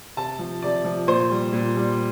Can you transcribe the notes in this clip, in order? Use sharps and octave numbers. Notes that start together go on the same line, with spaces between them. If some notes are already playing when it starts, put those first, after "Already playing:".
C3 A5
F3
C3 D5
F3
A#2 C5
G3
A#2
G3